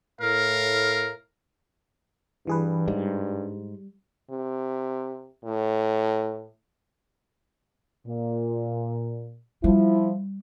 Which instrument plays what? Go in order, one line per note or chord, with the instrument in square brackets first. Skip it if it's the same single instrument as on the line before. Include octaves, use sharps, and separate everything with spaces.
[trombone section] A2 [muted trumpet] A#4 [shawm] F5
[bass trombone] G2 [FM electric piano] E3 G#4 B4
[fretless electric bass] G#2 [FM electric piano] G3
[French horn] C3
A2
[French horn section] A#2
[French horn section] F3 E4 [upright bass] G3